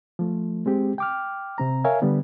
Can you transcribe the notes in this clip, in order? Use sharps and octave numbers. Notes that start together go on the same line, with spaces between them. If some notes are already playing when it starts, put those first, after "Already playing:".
F3 A3
G#3 C4 G4
G5 D6 F6
C3 C4 A#5
A#4 C#5 E5 F5 G#5
D3 G3 B3